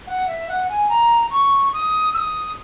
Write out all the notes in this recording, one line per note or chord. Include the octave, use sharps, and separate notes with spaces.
F#5
E5
F#5
G#5
A#5
C#6
D#6
E6
D#6